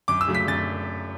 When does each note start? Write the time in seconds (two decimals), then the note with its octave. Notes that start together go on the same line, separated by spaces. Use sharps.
0.08 F#2 D6
0.21 E6
0.28 C#3 F#3 A3
0.35 B6
0.48 F#2 A6